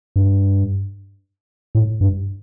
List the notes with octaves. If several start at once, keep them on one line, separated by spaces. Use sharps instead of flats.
G2
A2
G2